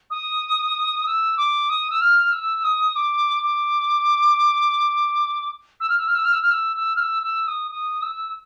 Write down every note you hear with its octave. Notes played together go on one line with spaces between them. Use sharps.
D#6
E6
D6
D#6
E6
F6
E6
D#6
D6
D6
E6
F6
E6
F6
E6
F6
E6
F6
E6
E6
F6
E6
E6
D#6
D#6
E6